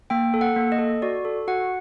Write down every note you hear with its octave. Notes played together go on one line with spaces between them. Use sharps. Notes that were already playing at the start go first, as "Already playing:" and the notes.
A#3 G5
A4
F#5
A#3
D#5
A4
F#4 D5
A4
F#4 F#5